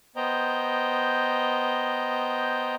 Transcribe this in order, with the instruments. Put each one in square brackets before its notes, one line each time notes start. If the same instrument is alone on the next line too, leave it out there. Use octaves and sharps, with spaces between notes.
[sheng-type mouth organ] B3 C5 D#5 G5 A#5 G6